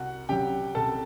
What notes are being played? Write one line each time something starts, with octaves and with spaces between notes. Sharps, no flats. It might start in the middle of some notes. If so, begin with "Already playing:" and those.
Already playing: C2 F#4 F#5
C3 F#3 G4 G5
C2 A4 A5